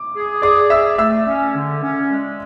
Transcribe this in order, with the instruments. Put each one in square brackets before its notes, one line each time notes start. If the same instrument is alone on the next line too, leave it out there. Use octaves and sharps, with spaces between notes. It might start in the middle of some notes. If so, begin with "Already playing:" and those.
Already playing: [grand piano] D6
[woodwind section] G#4
[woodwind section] G#4 [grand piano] D5 D6
[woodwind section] G#4 [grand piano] E5 E6
[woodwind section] A3 [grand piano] E5 E6
[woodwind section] C#4
D3
C#4
G#3